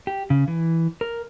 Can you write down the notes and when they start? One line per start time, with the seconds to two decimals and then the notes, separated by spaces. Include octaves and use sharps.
0.07 G4
0.30 C#3
0.48 E3
1.01 A#4